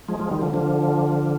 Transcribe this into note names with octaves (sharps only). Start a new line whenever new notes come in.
F3 G#3
F3 G#3
D#3 G3
D3 F3
D3 F3